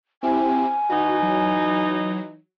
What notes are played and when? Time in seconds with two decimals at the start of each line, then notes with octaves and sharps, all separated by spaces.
0.23 C4 E4 G4 G#5
0.90 E3 D#4 F#4
1.23 F#3